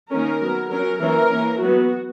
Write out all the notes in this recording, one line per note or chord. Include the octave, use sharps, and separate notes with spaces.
D#3 A#3 C#4 A#4
F#3 B3
F#3 C#4 A#4
E3 A#3 C#4 A#4
E3 A#3 C#4
F#3 B3 F#4